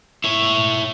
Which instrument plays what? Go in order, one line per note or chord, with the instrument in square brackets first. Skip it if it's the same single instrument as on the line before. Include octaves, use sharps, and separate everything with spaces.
[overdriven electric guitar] E4 C#5